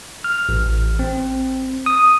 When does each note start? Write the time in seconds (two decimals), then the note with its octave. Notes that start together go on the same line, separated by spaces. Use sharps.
0.24 F6
0.49 A1
0.99 C4
1.86 D#6